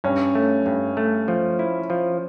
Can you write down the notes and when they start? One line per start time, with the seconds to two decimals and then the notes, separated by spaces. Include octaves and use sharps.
0.04 G2 C#4
0.35 A3
0.66 G2
0.97 A3
1.28 F3
1.59 E4
1.90 F3